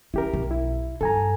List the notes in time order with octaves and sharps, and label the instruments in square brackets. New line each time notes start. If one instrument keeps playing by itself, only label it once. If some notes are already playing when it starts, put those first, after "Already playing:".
[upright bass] C#4 [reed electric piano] E4 G4 A#4
[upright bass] B1
[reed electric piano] E4
[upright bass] G2 [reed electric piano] A4 G#5 A#5